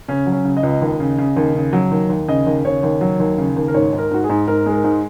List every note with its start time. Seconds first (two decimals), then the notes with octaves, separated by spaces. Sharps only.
0.08 C#3 C#4
0.26 F#3
0.32 C#4
0.45 C#3
0.57 D#5
0.63 C#2
0.82 D#2
1.00 C#3
1.18 C#3
1.37 D#2
1.55 C#3
1.73 F#3
1.91 D#2
2.09 D#2
2.28 C#3 D#5
2.46 D#2
2.65 C#3 C#5
2.83 D#2
3.01 F#3
3.20 D#2
3.38 C#3
3.56 D#2
3.68 A#4
3.74 G#2 C#5
3.93 G#2
3.98 A#4
4.11 G#2 F#4
4.24 G#4
4.29 G#2
4.48 G#2 A#4
4.66 G#3
4.72 A#4
4.84 G#2